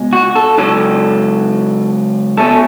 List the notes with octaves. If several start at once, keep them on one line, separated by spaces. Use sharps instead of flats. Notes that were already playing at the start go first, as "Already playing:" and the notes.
Already playing: C#2 B2 G#3
F#4
A4
C#2 C#3 F#3 A4
B2 A3 C#4 A4